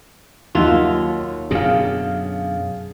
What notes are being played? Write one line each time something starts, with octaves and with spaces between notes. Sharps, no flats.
D#2 F#3 F4 D#5 E5
F#2 B2 D3 G#4 F5